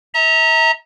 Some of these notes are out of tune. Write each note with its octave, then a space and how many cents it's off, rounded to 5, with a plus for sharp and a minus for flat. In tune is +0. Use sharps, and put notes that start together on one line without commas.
E5 -40 A#5 -15